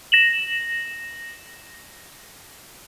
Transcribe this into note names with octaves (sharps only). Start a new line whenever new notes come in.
A#6 E7 F#7